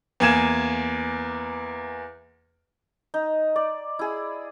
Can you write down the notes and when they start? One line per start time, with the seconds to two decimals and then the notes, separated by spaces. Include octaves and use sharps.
0.20 E2 A#3 G#5 G#6 E7
3.14 D#4
3.56 D5
3.99 E4 G#4